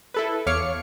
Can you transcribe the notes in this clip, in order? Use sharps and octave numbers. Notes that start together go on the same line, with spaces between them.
E4 A4 B4
E2 C#5 F5 D6 F6 C#7